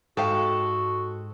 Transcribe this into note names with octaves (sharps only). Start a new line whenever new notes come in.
G#2 G#3 F#4 G4 A4 C5 F5 D#6